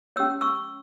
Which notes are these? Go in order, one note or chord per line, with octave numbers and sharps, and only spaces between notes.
C#4 G4 C#5 E6
C#6 E6